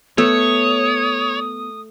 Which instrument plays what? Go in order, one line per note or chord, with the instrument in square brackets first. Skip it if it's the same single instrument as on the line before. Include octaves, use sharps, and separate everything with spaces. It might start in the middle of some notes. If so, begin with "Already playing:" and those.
[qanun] A3 [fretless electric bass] B3 [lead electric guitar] C#5 [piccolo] D#6